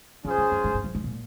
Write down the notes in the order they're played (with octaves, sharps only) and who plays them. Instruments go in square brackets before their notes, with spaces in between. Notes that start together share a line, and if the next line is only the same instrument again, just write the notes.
[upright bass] C#3 [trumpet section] C#4 F4 G#4 C5
[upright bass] C#3
G2
G#2
G#2
G2
G#2
A#2